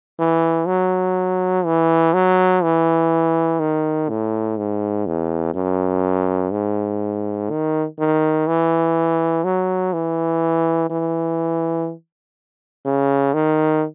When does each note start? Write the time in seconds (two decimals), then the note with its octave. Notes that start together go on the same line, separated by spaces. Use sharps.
0.19 E3
0.67 F#3
1.65 E3
2.14 F#3
2.63 E3
3.59 D#3
4.09 A2
4.57 G#2
5.06 E2
5.54 F#2
6.52 G#2
7.50 D#3
7.99 D#3
8.47 E3
9.44 F#3
9.93 E3
10.90 E3
12.85 C#3
13.34 D#3